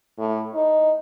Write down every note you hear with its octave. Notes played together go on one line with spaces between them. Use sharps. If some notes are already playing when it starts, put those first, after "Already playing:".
A2
D#4